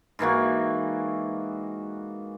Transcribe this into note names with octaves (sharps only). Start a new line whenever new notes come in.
G#2 E3 A#3 F#4